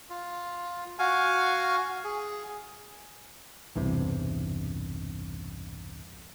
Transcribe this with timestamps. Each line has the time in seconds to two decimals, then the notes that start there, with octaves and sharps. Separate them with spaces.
0.10 F4
0.99 F#4 F5 G#5
2.04 G#4
3.75 B1 E2 G2 C3